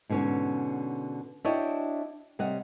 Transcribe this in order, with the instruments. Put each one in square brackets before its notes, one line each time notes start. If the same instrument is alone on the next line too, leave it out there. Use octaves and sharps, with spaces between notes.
[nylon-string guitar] G#2 B2 D3 C#4 C#5
D4 E4 F#4 C#5 D#5 G5
C3 G3 C#5 D#5 F#5